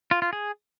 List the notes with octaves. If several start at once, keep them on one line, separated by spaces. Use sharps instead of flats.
F4
F4
G#4